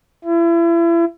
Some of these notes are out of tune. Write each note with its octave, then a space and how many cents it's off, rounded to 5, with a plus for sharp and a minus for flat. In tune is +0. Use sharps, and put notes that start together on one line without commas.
E4 +35